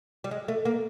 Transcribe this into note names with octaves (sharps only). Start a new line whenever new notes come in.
G3
G#3
A3
A#3